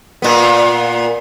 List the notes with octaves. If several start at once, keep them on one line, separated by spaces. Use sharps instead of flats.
A#2 B3